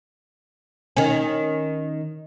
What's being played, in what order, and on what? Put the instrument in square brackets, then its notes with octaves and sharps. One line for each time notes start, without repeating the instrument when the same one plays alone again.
[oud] D#3 C#4